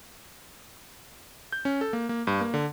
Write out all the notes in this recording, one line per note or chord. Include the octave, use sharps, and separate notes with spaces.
G6
C#4
A4
A#3
A#3
G2
A#3
D3